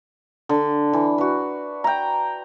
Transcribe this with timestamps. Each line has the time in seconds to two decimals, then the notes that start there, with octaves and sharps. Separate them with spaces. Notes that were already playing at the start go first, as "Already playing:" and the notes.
0.49 D3
0.93 E3
1.18 F#4 B4
1.84 G5 A#5